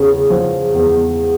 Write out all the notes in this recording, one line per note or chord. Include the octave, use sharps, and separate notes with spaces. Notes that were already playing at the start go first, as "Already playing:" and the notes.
Already playing: E2 C#3
F3
E2